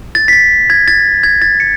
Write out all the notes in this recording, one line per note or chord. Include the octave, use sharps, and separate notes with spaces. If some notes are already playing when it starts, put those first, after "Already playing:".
A6
B6
A6
G#6
A6
G#6
A6
C#7